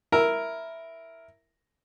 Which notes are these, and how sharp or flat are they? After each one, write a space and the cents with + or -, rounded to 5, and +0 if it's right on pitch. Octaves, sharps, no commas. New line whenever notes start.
E4 +0 A#4 +0 E6 +0